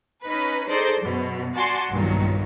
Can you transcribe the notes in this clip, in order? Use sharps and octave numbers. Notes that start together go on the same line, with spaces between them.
C#4 D#4 B4
D#4 G#4 A4 C5 D5
F#2 B2
F#4 D5 F#5 G#5 A5 C6
B1 G2 A#2 D#3 F#3